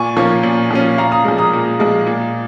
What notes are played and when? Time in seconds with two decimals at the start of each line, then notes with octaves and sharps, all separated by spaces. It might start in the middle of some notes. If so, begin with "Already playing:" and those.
Already playing: A#2 G#5 C#6
0.17 F3 A#3 C#4
0.43 A#2
0.71 F3 A#3 C#4
0.98 A#2 F5 A#5
1.12 A#5 D#6
1.25 F3 G#3
1.38 A#5 D#6
1.53 A#2
1.80 F3 G#3
2.07 A#2